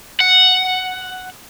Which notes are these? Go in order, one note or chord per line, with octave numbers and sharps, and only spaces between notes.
F#5